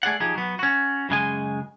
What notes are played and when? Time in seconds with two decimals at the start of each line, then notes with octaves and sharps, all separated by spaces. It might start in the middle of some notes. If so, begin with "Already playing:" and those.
0.03 A3 G#4 D5 F#5
0.20 F3 D#4 G4 G#4
0.35 F#3 B3
0.59 C#4 F#4
1.09 F#2 C#3 G#3 G#5